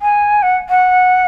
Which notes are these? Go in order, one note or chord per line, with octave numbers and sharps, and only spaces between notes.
G#5
F#5
F#5